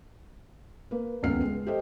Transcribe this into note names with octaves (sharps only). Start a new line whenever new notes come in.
A#3 B4
D#1 C#2 F#2 B3 F6 C7
G#3
G4 A4 C5 D#5